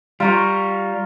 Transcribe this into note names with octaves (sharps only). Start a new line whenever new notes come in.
G3 F4 A#5 C#6